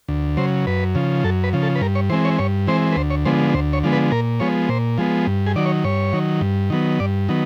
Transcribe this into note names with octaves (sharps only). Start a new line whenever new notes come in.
D2
C#3 F#3 C5
F#2 B4
C#3 F3
F#2 A4
B4
C#3 F3
A4
B4
G2 A#4
C#5
E3 G#3 C4 C5
C#5
G2 C#5
E3 G#3 C4 C5
B4
D2 C5
C#5
D3 F3 G#3 B3 C5
D2 C5
C#5
D3 F3 G#3 B3
B4
A#2 A#4
F3 G#3 B3 C#5
A#2 C5
F3 G#3 B3
G2
G#4
D#3 F#3 D5
C#5
G2 C#5
D#3 F#3
G2
D#3 F#3 B3
G2 D5
D#3 F#3 B3